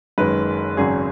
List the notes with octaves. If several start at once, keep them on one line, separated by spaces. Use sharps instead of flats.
F#1 F#2 D#3 G#3 B4
G#1 F#2 C#3 F#3 G#4